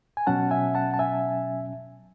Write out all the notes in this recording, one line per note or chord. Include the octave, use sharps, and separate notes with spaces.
G#5
B2 F#3 C#4 F#5 A5
E5 G#5
F#5 A5
A5
E5 G#5